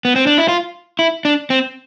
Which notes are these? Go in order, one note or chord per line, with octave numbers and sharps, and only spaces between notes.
B3
C4
D4
E4
F4
E4
D4
C4